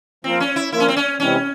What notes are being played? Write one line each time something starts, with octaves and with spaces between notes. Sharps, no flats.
F3 A#3 C4 F4 A#4
C#4
E4
F3 A#3 E4 F4 A#4
C#4
C4
C#4
C3 E3 G#3 C4 C#4 E4